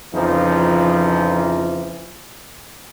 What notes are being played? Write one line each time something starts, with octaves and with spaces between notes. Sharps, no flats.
F2 C#3 E3 F3 D#4